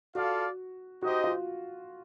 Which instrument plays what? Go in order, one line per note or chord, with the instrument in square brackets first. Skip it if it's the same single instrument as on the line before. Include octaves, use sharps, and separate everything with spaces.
[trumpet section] F4 A4 D5 F5 [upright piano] F#4
[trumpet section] D#4 G4 C5 D#5 [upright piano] F#4
[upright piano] F4